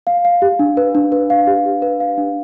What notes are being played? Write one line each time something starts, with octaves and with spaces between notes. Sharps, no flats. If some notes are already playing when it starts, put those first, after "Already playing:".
F5
F5
G4
D4
B4
D4
B4
F5
G4
G4
B4
F5
D4